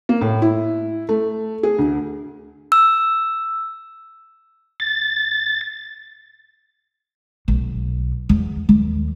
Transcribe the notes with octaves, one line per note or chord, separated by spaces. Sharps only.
A#3
A2
E4
A3
G#4
D2
E6
A6
B1
E2
D#2